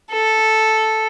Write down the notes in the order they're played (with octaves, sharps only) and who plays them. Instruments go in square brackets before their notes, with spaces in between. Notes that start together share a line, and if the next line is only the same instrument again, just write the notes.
[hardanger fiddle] A4